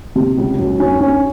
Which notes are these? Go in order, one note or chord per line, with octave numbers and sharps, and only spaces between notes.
C3
C#2
F#2
C#4
C#4